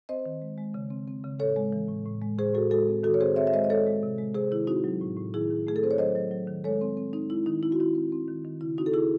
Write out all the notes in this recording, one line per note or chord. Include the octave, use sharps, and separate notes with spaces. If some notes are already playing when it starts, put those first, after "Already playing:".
C4 C5 D#5
D#3
G#3
G#3
C#3
C4
C4
C#3
A2 A4 C#5
G#3
E3
A2
A2
G#3
A2 G#4 C5
A2 F#4 A4
G#3 F#4 A4
C4
D#3 F#4 A4
C#5
C4 G#4 C5
C4 C#5 E5
E5
G#3 C5 D#5
D#5
G#3 A4 C#5
G#3
C3
G#3
C3 G#4 C5
D#3 E4
C4 D#4 F#4
F#3
A2
A2
D#3 E4 G#4
D#3
A3 G#4
A4
C4 C5
C#5
F#3 C5 D#5
F#3
F#3
D#3
G#3 A4 C#5
C4
C4
C4 D#4
G#3 E4
D#3 D#4
C4 E4
F#4
D#3 E4
C4
C4
D#3
D#3
C#3 E4
C4 D#4 F#4
A4
C#3 E4 G#4